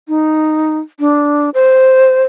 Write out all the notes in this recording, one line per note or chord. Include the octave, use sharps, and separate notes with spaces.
D#4
D4
C5